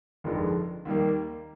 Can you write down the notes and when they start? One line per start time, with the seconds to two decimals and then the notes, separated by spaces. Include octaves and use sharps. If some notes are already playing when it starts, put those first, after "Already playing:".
0.24 G1 F2 D#3 G#3 D4
0.85 D#2 D#3 G3 A#3